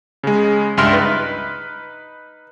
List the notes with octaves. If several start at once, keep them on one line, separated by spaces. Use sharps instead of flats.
C#3 G#3
C#2 G2 E5 C6 F6
D#4 B4